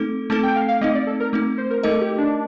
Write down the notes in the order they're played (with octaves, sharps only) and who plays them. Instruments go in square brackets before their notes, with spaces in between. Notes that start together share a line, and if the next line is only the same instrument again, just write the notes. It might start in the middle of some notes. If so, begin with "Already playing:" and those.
Already playing: [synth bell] A3 C4 D#4 A4
[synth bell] A3 C4 D#4 A4 [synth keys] A5
[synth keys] G5
F5
F5
[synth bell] A3 C4 D#4 [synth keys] D#5
[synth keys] D5
A4
A#4
[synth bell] A3 C4 D#4
[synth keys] C5
A#4
[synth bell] A3 D#4 A#4 D#5 [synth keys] A4
[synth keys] G4
D4